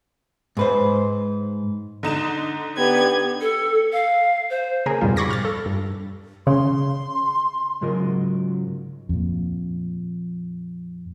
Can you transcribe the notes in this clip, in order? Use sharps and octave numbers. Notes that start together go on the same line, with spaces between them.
G#2 B4 C5
D3 D#4 E7
B3 D4 G4 G5 G#6
A4
F5
C5
C#3 A#3 G#4 A#4
F2 G#2 B2 G3 F4
B5 C#6 D6 G#6 A#6 C7
F6 A6
A4
G2
C#3 C6
G#2 C#3 F#3 F4 A#4 D#5
F2 A#2